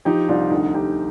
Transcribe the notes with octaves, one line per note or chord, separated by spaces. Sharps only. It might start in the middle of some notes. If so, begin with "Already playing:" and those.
F3 D#4 G4
C2 D4 F4
D2 D#4
D2 D#4 G4